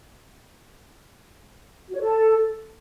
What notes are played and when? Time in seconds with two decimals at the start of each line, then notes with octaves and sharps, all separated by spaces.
1.90 F#4
1.95 C#5
2.01 A4